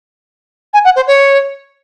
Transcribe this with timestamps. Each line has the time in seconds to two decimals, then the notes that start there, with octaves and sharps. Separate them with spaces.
0.74 G#5
0.85 F#5
0.96 C5
1.07 C#5